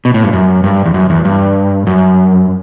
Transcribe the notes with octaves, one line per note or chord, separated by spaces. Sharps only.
B2
A2
G2
F#2
G2
E2
F#2
E2
G2
F#2